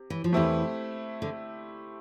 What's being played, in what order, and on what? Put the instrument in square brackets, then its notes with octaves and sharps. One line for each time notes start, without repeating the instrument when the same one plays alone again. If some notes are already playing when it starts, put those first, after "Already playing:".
Already playing: [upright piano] C3
[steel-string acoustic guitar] E3
F3
[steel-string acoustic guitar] E2 E3 [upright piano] A3 C4 E4 G4
[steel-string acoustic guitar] D3